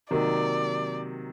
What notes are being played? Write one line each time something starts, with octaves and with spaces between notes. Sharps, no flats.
C3 D#3 F#3 A#3 D5